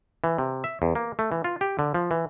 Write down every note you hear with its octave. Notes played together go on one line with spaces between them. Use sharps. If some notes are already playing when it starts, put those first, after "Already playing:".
E3
C3
E5
E2
A#3
A3
E3
F4
G4
D3
F3
E3